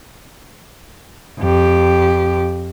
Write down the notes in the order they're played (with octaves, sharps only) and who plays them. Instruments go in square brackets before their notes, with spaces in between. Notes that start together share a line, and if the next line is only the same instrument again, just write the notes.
[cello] F2 G4